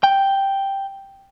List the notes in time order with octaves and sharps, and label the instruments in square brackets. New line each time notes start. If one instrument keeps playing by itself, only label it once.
[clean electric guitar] G5